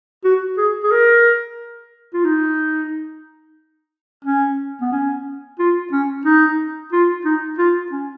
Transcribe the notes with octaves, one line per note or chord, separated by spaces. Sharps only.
F#4
G#4
G#4
A#4
F4
D#4
C#4
B3
C#4
F4
C#4
D#4
F4
D#4
F4
C#4